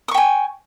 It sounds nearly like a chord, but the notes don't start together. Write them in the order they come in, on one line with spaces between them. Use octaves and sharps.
D#6 C#6 G5 G#5